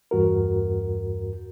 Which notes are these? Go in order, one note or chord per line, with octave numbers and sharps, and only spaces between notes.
E2 G2 F#4 A#4